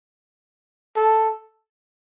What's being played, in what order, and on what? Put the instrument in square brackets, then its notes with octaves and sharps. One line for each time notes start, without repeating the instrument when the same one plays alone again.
[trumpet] A4